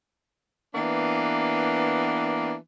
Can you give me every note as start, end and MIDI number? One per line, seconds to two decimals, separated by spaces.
0.75 2.55 52
0.75 2.55 58
0.75 2.55 59
0.75 2.55 62